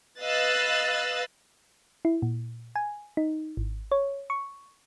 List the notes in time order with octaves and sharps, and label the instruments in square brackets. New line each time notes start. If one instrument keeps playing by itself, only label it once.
[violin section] B4 D#5 F5 E6 F#6 A6
[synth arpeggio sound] E4
A#2
G#5
D#4
G#1
C#5
C#6